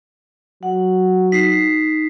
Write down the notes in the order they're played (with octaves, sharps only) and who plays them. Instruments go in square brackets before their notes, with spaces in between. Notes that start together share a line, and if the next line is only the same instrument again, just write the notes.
[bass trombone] F#3 [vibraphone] F#5
[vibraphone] D#4 [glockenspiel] B6 C7